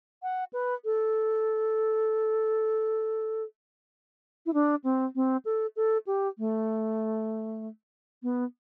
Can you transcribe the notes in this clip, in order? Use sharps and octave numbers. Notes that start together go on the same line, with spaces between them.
F#5
B4
A4
E4
D4
C4
C4
A4
A4
G4
A3
B3